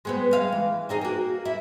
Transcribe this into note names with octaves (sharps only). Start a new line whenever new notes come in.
G#3 B3 C4
G#3 F5
E3
C4 D#4 G#4
A#3 F#4
E4